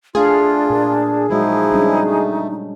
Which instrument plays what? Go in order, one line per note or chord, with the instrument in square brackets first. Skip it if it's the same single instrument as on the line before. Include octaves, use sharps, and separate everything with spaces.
[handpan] A3 F5 [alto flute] D4 [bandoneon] F4 [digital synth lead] G#4
[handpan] A#2 A#4
[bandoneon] F3 E4 [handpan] F#3 G#3 F#4 [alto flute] D#4
[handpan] G3 C#4 D4
[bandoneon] A3